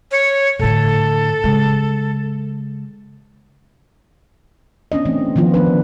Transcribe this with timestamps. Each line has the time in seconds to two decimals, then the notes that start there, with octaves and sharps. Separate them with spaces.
0.11 C#5
0.59 A2 D3 A4
1.44 C#3 G#3
4.92 B3 C#4 D4 D#5
5.05 E3 A3 C4
5.36 D#3 F3 B3 F4
5.54 B3 D4 B4
5.67 D3